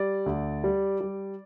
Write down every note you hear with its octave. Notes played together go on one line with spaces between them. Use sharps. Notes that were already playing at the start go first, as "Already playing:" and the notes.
Already playing: G3 D5
D2
G3
G3